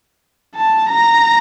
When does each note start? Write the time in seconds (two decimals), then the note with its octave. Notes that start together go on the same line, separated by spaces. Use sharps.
0.56 A5
0.89 A#5